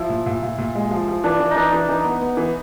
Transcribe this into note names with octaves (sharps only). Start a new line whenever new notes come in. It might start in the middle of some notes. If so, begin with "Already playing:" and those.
Already playing: F3 E4
A#2
A#2
A#2
A#2
G#3
F3
F3
E3 D4
E3
D#4
E3 D4
E3
E3 D#4
B3
B3
E3